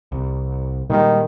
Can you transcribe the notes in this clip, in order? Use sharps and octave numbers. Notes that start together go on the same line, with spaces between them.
C2
A#2 D#3 G3 G#3